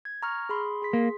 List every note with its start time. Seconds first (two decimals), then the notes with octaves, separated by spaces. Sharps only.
0.05 G#6
0.23 A#5 C#6 F6
0.49 G#4 B5 C6
0.82 G#4 C6 B6
0.93 A#3